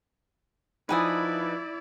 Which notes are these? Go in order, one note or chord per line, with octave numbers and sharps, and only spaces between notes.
F3 D#4 E4 B4 D5 G#5 D#6